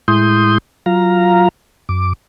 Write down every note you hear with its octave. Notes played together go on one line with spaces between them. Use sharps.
A2 G#3 E4 C6 D#6 G6
F#3 F4 F5 A#5
F#2 D6